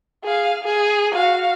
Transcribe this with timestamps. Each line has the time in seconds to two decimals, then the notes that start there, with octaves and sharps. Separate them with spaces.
0.24 G#4 F5
0.64 G#4
1.14 F#4 F5